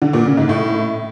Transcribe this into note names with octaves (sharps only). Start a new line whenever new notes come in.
D3
A#2
C#3
G#2
A2